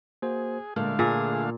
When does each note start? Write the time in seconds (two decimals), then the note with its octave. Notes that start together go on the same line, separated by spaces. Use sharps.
0.22 A#3 F#4 G#4 C5
0.76 A#2 D3 G#3 A3 F5
0.99 A#2 G#4 G#5